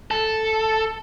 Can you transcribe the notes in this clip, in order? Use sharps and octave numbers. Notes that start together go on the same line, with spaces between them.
A4